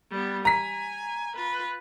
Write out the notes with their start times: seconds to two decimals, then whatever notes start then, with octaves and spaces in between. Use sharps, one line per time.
0.10 G3 B3
0.45 G#5 A#5 B6
1.36 F4 B4